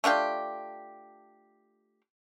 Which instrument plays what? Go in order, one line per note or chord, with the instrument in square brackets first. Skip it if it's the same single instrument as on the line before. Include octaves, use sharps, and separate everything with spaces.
[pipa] A3 D4 F4 G4